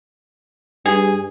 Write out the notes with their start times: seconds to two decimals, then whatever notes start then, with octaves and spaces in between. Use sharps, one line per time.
0.86 G2 G#4